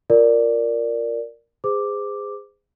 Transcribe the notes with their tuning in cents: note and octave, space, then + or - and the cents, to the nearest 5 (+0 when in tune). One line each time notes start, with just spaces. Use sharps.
F4 +0 A#4 -5 D5 +0
G#4 -25 C5 -35 D6 +0